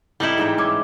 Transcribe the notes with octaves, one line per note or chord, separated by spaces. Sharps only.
A2 G3 D#4 E4
G#2 E3 G5
C4 C#4 G5 D6 G#6